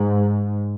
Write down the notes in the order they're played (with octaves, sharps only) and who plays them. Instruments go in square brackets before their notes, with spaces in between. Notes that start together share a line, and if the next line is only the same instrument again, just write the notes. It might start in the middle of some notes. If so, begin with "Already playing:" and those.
Already playing: [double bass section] G#2